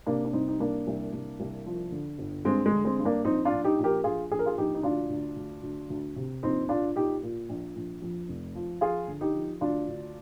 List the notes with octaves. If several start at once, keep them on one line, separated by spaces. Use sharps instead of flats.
C3 A#3 D4
D4
C2 C4 D#4
D#4
C2 A#3 D4
C2
C2
C2
F3
D3
G1
G2 G#3 C4
G#3
D3
G#3 C4
G2
A#3 D4
A#1 C4 D#4
D4 F4
A#1
D#4 G4
A#1
G4 A#4
A#1 F4 G#4
A#1 G#4
A#4
F4 G#4
A#1 D#4 G4
D#4
D2 D4 F4
D2
D2
D2
D2
C3
A#1 C4 D#4
A#2 D4 F4
A#2 D#4 G4
A#2
A#1
A#1
F2
F1
F3
F3 F4 G#4
D3
D#4 G4
F3
D2 D4 F4
D2